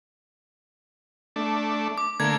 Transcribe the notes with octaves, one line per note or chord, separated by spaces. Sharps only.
A3 D4
D6
D3 A3 A#3 G#6